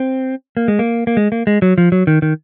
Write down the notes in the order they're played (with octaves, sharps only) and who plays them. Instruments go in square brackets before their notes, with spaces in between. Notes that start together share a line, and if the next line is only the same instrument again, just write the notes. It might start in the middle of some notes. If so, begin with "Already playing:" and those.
Already playing: [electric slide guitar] C4
A#3
G#3
A#3
A#3
G#3
A#3
G#3
F#3
F3
F#3
D#3
D#3